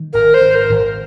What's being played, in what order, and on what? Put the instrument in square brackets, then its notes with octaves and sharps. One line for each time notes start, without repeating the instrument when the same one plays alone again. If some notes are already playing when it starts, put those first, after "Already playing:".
Already playing: [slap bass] D#3
[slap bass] G#1 [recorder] A#4
[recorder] C5
[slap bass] D#3
[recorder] A#4
[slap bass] G#1